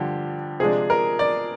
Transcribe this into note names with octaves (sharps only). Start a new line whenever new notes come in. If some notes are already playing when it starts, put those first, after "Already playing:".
Already playing: G2 D3 F3 G4
C3 F3 G#3 D4 G#4
A#4
D5